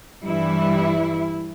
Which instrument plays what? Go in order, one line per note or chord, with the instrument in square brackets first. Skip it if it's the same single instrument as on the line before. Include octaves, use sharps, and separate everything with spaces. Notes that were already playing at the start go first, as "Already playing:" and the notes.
[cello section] G2 E3 G3 E4